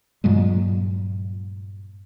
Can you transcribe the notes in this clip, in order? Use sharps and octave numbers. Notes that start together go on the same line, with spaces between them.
G2 A#2 F#3 G#3